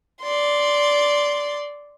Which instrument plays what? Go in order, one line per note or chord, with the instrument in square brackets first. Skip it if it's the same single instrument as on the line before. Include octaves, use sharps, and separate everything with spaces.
[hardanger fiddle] D5 C6